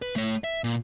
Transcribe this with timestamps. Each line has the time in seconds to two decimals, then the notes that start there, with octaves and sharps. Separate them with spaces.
0.02 B4
0.16 A3 C#5
0.44 E5
0.64 A#2